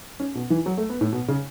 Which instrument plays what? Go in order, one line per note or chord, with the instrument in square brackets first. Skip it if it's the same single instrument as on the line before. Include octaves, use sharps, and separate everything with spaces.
[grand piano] C#4
B2
E3
F#3
A3
B3
A2
B2
C#3